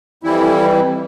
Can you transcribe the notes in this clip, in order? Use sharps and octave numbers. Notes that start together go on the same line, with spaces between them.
F2 E3 G3 E4